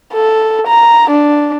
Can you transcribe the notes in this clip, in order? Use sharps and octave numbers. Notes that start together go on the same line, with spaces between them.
A4
A#5
D4